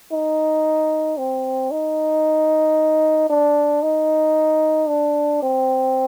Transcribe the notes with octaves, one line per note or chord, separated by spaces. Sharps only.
D#4
C4
D#4
D4
D#4
D4
C4